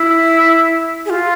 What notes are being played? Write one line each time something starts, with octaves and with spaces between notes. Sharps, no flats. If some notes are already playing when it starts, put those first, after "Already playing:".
Already playing: E4
G#4
F4